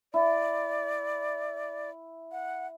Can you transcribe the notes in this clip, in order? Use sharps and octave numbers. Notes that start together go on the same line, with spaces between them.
E4 D5
F#5